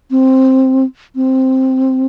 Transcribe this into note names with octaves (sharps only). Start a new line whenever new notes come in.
C4
C4